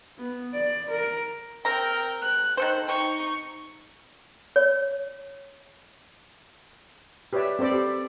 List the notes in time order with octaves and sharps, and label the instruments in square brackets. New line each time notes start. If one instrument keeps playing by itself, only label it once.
[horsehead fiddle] B3
D5
A#4
[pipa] C4 A#5 [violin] A#4 G5
[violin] F#6
[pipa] D#3 A4 C5
[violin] D#4 C#6 [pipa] C5 G5
[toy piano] C#5
[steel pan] G4 B4 C#5 D5 E5
C4 A4 C5 D5 B5
G4